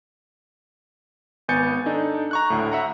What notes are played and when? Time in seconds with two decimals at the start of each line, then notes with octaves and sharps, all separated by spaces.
1.48 G#1 B3 G#5 G6 A6 C#7
1.86 D4 D#4 A4
2.31 A#5 C#6 F#6
2.50 D2 A2
2.72 E5 F#5 A#5